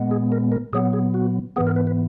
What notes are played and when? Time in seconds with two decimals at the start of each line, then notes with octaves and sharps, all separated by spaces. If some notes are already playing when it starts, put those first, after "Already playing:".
Already playing: A#2 G#3 B3
0.11 G#4
0.32 A#4
0.52 A#4
0.73 A#2 F#3 B3 G#4
0.93 G#4
1.14 F#4
1.56 G#2 E3 B3 G#4
1.67 A#4
1.76 B4
1.87 B4